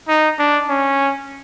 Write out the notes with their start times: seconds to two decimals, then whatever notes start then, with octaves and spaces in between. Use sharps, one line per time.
0.08 D#4
0.39 D4
0.69 C#4